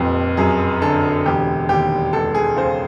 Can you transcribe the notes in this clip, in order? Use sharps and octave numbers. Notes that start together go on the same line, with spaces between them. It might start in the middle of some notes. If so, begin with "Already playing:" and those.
Already playing: F1 F2 A#2 G4
F#2 G#4
D3 A4
E1 G4
D#2 G4
C#2 A4
G#4
C#3 C5